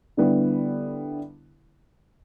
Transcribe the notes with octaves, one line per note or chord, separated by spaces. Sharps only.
D3 G3 B3 E4